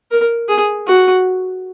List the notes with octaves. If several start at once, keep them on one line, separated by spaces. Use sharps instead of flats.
A#4
G#4
F#4